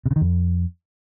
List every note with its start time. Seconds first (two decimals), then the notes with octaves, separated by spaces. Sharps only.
0.06 C3
0.11 C#3
0.16 D#3
0.21 F2